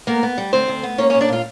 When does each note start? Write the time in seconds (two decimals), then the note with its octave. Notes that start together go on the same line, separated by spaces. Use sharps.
0.07 A#3 B3 A#4
0.23 B3
0.38 G3
0.53 D2 C4 C5
0.68 D2
0.83 B3
0.98 A#3 C#4 C#5
1.10 C#4 C#5
1.14 A#2
1.21 D4 D5
1.29 A#2 F4 F5